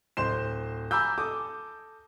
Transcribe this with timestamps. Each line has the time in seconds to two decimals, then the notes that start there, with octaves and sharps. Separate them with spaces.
0.17 D1 C5 C6 E7
0.91 G#5 A#5 B5 D6 E6 G6
1.18 A4 D6 D#6